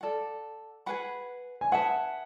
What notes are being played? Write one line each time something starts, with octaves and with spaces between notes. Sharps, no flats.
A4 D5 F#5
G#4 B4 F#5 B5
G#5
G#4 B4 E5 F#5 A5